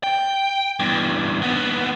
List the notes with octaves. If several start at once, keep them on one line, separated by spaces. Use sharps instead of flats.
G5
E2 G2
D#2 B3